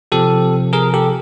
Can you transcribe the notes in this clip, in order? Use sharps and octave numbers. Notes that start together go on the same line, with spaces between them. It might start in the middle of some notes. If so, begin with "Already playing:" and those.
C3 F3 G4 A4
G#4 A#4
G4 A4